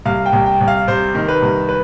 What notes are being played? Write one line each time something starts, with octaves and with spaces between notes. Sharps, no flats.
C2 F5
G5
C2
G5
C2
F5
C3 C5
D#3
B4
C2
B4